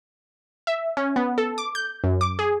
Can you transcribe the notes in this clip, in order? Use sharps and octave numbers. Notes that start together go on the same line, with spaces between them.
E5
C#4
B3
A4
D6
G6
F#2
D6
G#4